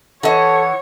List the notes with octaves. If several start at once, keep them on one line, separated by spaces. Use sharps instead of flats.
E3 A4 C#5 D#5 F#5